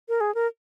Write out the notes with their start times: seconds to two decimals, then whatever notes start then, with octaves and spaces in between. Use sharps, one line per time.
0.09 A#4
0.21 G#4
0.35 A#4